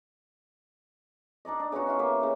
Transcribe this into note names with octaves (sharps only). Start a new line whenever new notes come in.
D4 D#4 D5 D#5
D4
C#3 B3 D#4 F#4
C#4 E4 F4
A#3 G4 B4 E5
C#3 D#4